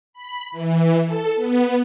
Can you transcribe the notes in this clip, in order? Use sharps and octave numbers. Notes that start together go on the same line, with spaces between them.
B5
E3
A4
B3